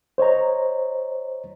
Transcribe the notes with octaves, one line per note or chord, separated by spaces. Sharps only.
C5 C#5 D#5 A#5